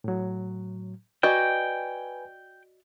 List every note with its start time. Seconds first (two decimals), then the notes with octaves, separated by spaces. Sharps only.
0.04 A2 F#3
1.23 F#4 B4 D5 D#5 G5 G#5